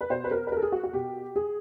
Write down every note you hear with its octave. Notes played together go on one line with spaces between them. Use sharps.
B4
B2 C5
B4
A#4
B4
A#4
A4
G#4
F#4
F#4
B2 G4
G#4